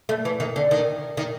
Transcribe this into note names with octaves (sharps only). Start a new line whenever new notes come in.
A3
E3
D#3
D3
D#3
D#3